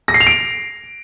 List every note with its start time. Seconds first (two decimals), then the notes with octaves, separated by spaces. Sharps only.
0.08 A#6
0.14 C7
0.20 F7
0.27 D7